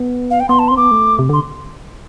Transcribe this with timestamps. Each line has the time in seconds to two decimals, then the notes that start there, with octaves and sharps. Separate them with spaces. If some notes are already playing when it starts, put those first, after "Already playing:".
Already playing: B3
0.31 F5
0.40 G5
0.49 B3 C6
0.59 A5
0.68 C6
0.71 C4
0.77 B3 D6
0.91 A3
1.19 C3
1.29 D3 C6